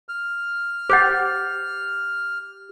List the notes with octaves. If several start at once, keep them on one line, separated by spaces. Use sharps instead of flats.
F6
G4 C5 F#5 D6 G6 A6